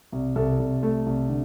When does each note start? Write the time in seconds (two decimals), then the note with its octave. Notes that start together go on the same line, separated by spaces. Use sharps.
0.12 C2
0.36 C2 A4
0.59 C2
0.83 A3
1.06 C2
1.30 D3